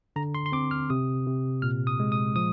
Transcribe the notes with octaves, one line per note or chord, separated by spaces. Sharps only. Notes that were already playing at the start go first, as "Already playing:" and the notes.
D3 A#5
C6
C6
C4 D6
F6
C3 D#6
C3
A#2 F6
D#6
G#3
D#6
F3 D#6